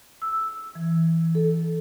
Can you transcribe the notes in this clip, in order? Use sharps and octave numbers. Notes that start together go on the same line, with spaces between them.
E6
E3
A4